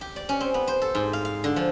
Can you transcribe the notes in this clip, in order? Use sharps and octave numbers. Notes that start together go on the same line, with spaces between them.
G4
D5
C#4
C4
B3
C5
A4
G#2
F5
F5
D3
F3